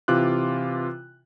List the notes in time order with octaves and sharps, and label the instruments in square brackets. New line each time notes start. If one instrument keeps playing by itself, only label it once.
[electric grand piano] C3 E3 F4 D6 F#6